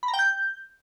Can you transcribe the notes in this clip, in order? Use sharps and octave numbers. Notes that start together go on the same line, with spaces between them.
B5
A#5
G5
G6